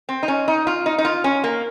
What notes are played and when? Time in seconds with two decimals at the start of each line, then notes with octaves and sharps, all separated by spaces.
0.09 C4
0.23 D#4
0.28 C#4
0.48 D#4
0.67 F4
0.86 D#4
0.98 D#4
1.05 F4
1.24 C#4
1.44 A#3